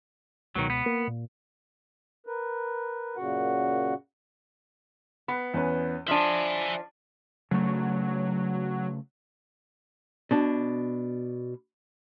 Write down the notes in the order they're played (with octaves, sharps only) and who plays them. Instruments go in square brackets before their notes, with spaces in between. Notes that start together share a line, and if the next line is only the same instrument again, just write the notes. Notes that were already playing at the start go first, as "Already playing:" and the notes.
[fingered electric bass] C#2 B2 [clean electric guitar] D#3 F#3
[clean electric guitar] B3
[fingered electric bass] A#3
A#2
[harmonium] A#4 B4
F#2 A#2 C#3 F#4 F#5
[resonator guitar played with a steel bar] B3 [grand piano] B5
[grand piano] E2 C#4 B4
[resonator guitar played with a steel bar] F3 D4 [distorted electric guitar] E5 G#5 [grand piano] F#7
[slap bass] C#3 A3 [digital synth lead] F#3
[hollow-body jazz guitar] B2 D4